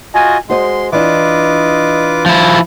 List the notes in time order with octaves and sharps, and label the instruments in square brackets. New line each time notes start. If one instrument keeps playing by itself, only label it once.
[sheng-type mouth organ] F4 F#4 D#5 [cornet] G#5
[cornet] G#3 [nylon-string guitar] F#4 C5 D#5 [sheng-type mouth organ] C6
[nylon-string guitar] E3 D4 [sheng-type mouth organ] F4 B4 D6 [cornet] D#5
[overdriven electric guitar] F3 E4